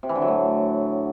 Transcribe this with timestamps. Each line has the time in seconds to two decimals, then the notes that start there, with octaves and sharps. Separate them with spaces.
0.03 C3
0.09 E3
0.15 D3
0.22 F#3
0.28 A2